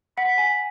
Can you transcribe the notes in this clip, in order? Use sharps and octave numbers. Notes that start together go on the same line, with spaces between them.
F#5 B5
G#5